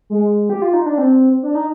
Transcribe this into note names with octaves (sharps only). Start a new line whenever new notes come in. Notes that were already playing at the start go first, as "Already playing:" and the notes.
G#3
G4
F4
D#4
D4
C4
D4
D#4